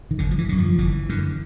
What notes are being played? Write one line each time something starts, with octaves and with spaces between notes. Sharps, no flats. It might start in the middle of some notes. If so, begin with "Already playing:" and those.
D#3
G1 D3
F3
E3
F#2 D3
F3
G1 E3
F#2 D3